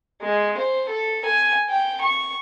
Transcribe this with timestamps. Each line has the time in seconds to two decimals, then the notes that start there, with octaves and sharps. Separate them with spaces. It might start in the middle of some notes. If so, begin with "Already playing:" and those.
0.22 G#3
0.58 C5
0.89 A4
1.26 G#5
1.69 G5
2.01 C#6